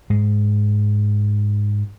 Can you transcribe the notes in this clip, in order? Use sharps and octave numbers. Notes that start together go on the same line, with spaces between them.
G#2 G#3